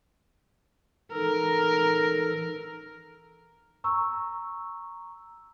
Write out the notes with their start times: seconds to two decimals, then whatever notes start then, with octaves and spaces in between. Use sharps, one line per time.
1.12 E3 D#4 A4 A#4
3.84 A#5 C#6 E6